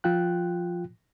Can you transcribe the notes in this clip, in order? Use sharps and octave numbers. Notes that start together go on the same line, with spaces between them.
F3 F4 G5 F#6